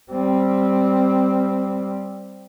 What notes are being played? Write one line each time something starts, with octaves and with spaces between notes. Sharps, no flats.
G3 C4